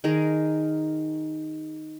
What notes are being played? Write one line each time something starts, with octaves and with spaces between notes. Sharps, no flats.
D#3 G#4 A#4